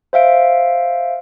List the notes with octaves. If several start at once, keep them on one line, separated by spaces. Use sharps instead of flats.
C5 E5 F5 D7